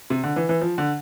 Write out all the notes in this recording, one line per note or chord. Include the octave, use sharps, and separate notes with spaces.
C3
D3
E3
E3
F3
D3